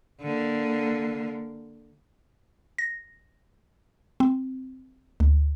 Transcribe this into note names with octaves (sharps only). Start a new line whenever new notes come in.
D3 A#3
A#6
C4
D2